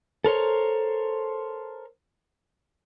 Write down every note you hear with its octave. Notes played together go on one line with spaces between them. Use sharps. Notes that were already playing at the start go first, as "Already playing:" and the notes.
A4 A#4 C5 C#5